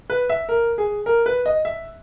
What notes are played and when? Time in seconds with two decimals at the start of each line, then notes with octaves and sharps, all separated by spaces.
0.10 B4
0.29 E5
0.49 A#4
0.78 G#4
1.06 A#4
1.26 B4
1.46 D#5
1.65 E5